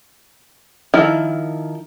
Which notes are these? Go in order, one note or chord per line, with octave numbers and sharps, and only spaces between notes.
D#3 F3 E4